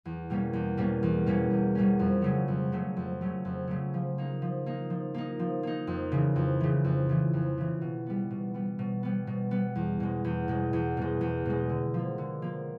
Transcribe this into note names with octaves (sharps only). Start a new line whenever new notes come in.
E2
B2 G3 A#3 C#4
E2
B2 G3 A#3 C#4
E2
B2 G3 A#3 C#4
E2
B2 G3 A#3 C#4
F2
C#3 F#3 A3 C#4
F2
C#3 F#3 A3 C#4
F2
C#3 F#3 A3 C#4
F2
C#3 F#3 A3 C#4
F3
A#3 D#4
F3
A#3 D#4
F3
A#3 D#4
F3
A#3 D#4
F2
C#3 E3
F2
C#3 E3
F2
C#3 E3
F2
C#3 E3
B2
G3 B3
B2
G3 B3
B2
G3 B3
B2
G3 B3
E2
B2 G#3
E2
B2 G#3
E2
B2 G#3
E2
B2 G#3
D3
F3 A#3
D3
F3 A#3